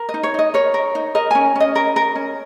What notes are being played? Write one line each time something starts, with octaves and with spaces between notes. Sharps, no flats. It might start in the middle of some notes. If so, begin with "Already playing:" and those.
Already playing: A#4
D#5
D#4
C#5
D#4 D#5
A#4 C#5
A#4
D#4
A#4 D#5
C#4 G#5
C#4 D#5
A#4
A#4
C#4